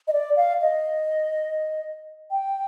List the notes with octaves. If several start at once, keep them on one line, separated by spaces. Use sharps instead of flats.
D#5
D5
F5
D#5
G5